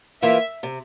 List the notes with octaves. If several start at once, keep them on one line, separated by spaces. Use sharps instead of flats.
E3 A#3 F4 E5
C3